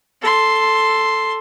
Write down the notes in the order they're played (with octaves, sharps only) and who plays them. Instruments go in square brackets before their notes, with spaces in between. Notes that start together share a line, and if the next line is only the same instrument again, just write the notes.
[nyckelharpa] A4 C6